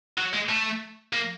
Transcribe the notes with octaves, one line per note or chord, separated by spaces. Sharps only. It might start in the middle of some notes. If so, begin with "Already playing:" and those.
F#3
G#3
A3
A#3